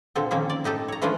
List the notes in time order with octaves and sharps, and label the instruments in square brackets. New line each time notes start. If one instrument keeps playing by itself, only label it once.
[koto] A#2 D3 C4 A4
D#3 F3 A#3 C4 C#4
D5
A2 D#4 G4 A4
C#5 A#5
E3 F3 A3 C#4 D4 F4